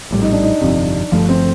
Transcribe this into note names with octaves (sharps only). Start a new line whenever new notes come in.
A#1 A2 G3
D#4
D4
D#4
G1 F2 C3
G1 G2 F3 A3
C4